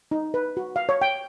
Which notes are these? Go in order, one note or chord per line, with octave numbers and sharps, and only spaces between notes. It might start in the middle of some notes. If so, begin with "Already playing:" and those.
D#4
B4
F#4
F5
C#5
G5